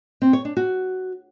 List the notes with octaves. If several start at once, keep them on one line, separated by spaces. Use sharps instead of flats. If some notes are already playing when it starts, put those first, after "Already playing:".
C4
C#5
D4
F#4